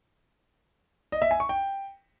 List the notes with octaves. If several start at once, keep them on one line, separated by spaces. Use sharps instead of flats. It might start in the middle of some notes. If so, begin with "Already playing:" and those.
D#5
E5
G#5
C#6
G5